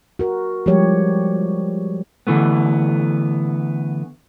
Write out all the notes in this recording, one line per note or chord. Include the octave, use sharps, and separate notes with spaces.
F#4 A#4
F3 G3 G#3 G4 C#5
D3 E3 A3 B3